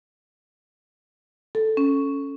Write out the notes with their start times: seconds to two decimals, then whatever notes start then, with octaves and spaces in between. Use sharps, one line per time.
1.55 A4
1.77 C#4